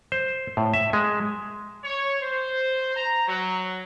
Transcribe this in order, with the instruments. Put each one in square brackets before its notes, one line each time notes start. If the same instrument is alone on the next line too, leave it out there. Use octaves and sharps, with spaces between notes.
[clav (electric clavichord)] C5
A2
E5
G#3
[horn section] C#5
C5
A#5
F#3